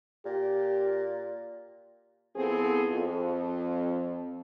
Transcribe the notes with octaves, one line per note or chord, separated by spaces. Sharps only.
A#2 G4
F3 B3 C4 E4 G#4 A4
F2